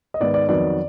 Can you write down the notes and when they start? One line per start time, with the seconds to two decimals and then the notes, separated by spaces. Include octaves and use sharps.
0.14 D#5
0.20 G#2 D#3 G#3 B3 D5
0.34 D5
0.49 F2 D#3 F#3 B3 D5